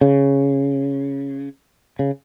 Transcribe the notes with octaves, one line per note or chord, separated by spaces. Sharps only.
C#3
C#3